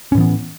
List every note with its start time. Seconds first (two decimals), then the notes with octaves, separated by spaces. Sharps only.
0.12 C#4
0.15 A2
0.18 E3
0.21 B3